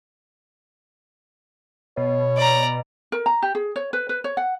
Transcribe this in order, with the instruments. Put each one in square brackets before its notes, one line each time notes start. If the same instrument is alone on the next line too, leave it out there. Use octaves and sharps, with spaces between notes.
[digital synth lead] B2 [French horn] C#5
[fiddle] D5 A#5
[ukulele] A#4
A#5
G4
G#4
C#5
B4
B4
C#5
F#5